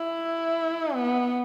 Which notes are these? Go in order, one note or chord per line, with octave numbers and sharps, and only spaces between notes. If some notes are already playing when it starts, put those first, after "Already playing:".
Already playing: E4
B3